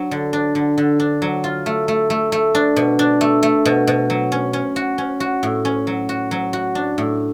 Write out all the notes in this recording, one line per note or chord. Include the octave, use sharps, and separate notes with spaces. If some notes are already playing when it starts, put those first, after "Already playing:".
Already playing: F#3 D4
D3
D4
D3
D3
D4
F#3
F4
A3
A3
A3
A3
D4
B2
D4
A3
A3
B2
B2
F#3
C#4
C#4
F#4
C#4
F#4
A2
C#4
F#3
F#4
F#3
F#4
D4
A2